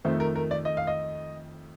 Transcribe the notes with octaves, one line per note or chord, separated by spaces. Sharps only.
F2 D#3 A3 C5
A#4
A#4
D5
D#5
F5
D#5